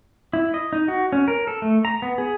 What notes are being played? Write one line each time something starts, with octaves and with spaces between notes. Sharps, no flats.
E4
D#5
D#4
F#4
C#4
A#4
A4
A3
A#5
B3
G#4